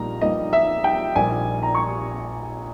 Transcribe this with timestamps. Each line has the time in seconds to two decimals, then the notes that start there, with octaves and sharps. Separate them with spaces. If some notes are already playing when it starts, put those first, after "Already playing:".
Already playing: A#1 A#2 G3 A#3 D#4 A#5
0.21 A#1 A#2 G3 A#3 D#4 D#5
0.53 E5
0.84 G5
1.16 A#1 A#2 G3 A#3 D#4 G#5
1.63 A#5
1.75 C#6